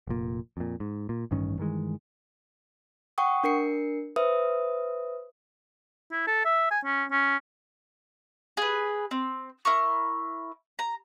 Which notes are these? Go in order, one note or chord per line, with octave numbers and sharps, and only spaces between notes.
F1 A#2
F2 A#2
G#2
A#2
A1 G2 D#3 C#4
G2 D#3 E3 G#3
F#5 G5 C#6 D#6
D4 A#4 C7 C#7
B4 C5 E5 D#6
E4
A4
E5
G#5
C#4
C#4
G#4 B4
C4
E4 A#4 C#6
A#5